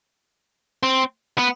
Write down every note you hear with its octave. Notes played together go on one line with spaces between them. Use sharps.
C4
B3